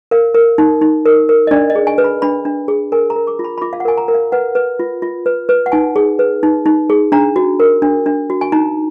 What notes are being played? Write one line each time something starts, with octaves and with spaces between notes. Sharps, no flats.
A#4 F5
A#4
D#4
D#4
A#4
A#4
D#5
D4 D5
D#5
G#4
G#5
B4
B5
D4 B5
D4
G#4
A#4 G#5
A#5
A#4
D6
F4
B5
B5
F4 D6
F5
F#5
A#4 G#5
A#5
A#4
F5
B4 F#5
B4
F4
F4
B4
B4
F#5
D#4 G#5
G#4
B4
D#4
D#4
G#4
D4 A#5
F#4
A#4
D4
D4
F#4
G#5
D#4 A#5